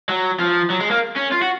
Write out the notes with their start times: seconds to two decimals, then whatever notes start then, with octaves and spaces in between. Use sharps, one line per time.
0.09 F#3
0.40 F3
0.70 F#3
0.80 G#3
0.90 A#3
1.16 C#4
1.31 F4
1.41 F#4